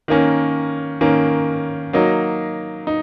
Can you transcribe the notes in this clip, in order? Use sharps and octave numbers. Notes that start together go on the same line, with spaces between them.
D#3 A#3 C#4
D#3 A#3 C#4
F#3 A#3 D#4
D#4